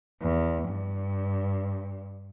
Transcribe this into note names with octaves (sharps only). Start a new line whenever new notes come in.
E2
G2